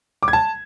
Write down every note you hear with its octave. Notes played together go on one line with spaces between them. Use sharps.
D6
G#6
A5